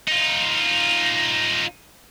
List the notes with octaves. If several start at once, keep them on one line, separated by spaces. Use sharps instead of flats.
D#4 F4